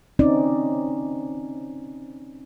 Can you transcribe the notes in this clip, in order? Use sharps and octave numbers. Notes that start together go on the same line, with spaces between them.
C4 C#4 D#4 D5